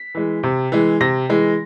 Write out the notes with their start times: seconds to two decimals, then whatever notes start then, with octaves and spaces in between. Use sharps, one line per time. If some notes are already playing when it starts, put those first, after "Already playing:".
Already playing: B6
0.15 E3 G#3
0.43 C3
0.72 E3 G#3
1.01 C3 A#6
1.29 E3 G#3